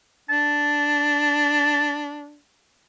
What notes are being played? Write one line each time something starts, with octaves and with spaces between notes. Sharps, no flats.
D4 A5